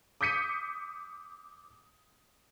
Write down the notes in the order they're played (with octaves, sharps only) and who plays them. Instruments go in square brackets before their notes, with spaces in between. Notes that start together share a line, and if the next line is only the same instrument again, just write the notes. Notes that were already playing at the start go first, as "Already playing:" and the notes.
[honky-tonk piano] D6 D#6 G6 B6 C#7 D#7